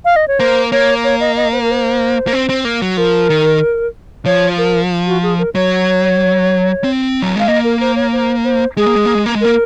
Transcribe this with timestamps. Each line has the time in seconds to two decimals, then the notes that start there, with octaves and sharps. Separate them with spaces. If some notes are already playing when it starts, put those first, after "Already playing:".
0.05 F5
0.16 D#5
0.28 C#5
0.39 A#3 C5
0.72 A#3 C#5
1.04 C#5
1.20 D#5
1.37 D#5
1.53 C5
1.62 A#4
1.71 C5
2.27 A#3
2.33 C4
2.49 C4
2.65 A#3
2.82 F#3
2.97 F3 A#4
3.30 D#3
4.26 F3 C#5
4.58 A#4
5.07 F#4
5.23 G#4
5.38 A#4
5.55 F#3 C#5
6.84 C4
7.22 F#3
7.36 G#3 F5
7.48 A#3 D#5
7.64 A#4
7.81 C5
7.96 C#5
8.13 C5
8.44 C5
8.77 G#3 G#4
8.86 A#3
8.96 G#3
9.06 A#3
9.15 G#3
9.26 A#3
9.35 G#3
9.41 A#3 A#4